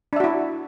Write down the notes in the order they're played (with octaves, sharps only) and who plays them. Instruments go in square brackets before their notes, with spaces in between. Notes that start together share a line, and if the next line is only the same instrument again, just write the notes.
[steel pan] D4
E5
F#4
E4